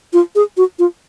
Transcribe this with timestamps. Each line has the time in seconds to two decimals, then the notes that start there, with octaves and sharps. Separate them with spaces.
0.13 F4
0.35 G#4
0.57 F#4
0.79 F4